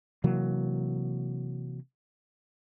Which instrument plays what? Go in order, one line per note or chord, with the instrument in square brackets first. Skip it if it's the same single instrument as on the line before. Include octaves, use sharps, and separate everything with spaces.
[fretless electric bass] C3 E3 F#3 A#3